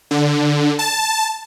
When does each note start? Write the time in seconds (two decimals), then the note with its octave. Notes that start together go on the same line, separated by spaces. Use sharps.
0.11 D3
0.79 A5